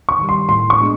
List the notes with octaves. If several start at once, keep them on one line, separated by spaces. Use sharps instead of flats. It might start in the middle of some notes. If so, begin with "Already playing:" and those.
C#6
D#3 G3
C6
A2 C6
C#6
G#3 B3 D4